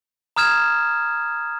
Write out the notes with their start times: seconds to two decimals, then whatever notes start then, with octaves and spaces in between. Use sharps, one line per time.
0.36 A#5 D#6 F6 G#6 E7